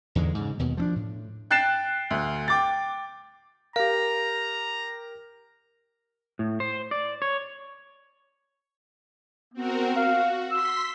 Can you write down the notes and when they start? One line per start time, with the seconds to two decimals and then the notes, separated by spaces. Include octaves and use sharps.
0.15 E2 G#2 D3 G#3
0.34 G#2 C#3
0.59 D#2 B2
0.77 F3 C4 D4
0.96 A2
1.51 G5 F#6 A6 C7 E7
2.11 D2
2.48 G5 D6 A6
3.76 G4 A#4 F5 A#5
6.39 A2
6.60 C5
6.91 D5
7.22 C#5
9.54 B3 C4 F#4 A#4
9.96 F#4 F5
10.51 C6 E6 B6